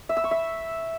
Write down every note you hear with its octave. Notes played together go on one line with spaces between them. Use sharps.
E5
E6
C#6
E5